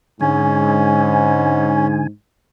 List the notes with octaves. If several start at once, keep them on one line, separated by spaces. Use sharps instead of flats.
G#2 D3 C#4 G#5